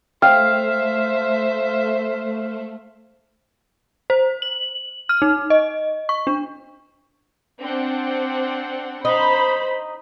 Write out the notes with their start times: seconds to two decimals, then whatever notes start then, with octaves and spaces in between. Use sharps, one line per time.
0.22 A3 C5 E5 F5 G5
4.10 C5
4.42 F#7
5.09 F6
5.22 D#4
5.50 D#5
6.09 C#6
6.27 D4
7.60 C4 D4 F#5
9.05 D#4 C5 B5